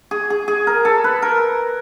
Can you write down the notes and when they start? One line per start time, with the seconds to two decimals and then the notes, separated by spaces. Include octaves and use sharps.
0.11 G#4
0.30 G#4
0.48 G#4
0.67 A#4
0.85 A4
1.04 B4
1.22 A#4